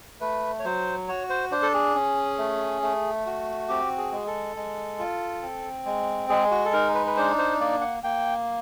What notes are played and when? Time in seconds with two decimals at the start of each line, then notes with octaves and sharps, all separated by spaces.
0.20 A3 B4
0.59 C#5
0.65 F#3 C5
1.08 F#4 C#5
1.30 C5
1.51 D4 C5
1.62 A4
1.74 G#4
1.95 C#4
2.38 A3
2.82 A3
3.26 F#4
3.69 C4 G4
3.98 G#4
4.12 G#3 G#4
4.27 A4
4.56 G#3
4.99 F4
5.42 C4
5.86 G#3
6.29 G#3 G#4
6.51 F#4
6.65 A4
6.73 D#4 A#4
6.94 B4
7.07 B4
7.17 D4 C5
7.38 C5
7.60 A#3 D5
7.81 F#5
8.03 A#3 G5